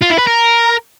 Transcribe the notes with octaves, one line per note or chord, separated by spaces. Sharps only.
F4
E4
B4
A#4